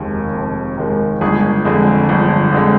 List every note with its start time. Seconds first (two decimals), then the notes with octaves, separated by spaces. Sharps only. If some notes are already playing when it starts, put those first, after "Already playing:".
Already playing: F1 D#2 D#3 G#3 A#3
0.33 F1
0.77 D#2 D#3 G#3
1.21 G1 G#3 G#4
1.65 F2 D3 G#3
2.09 G1
2.53 F2 D3 G#3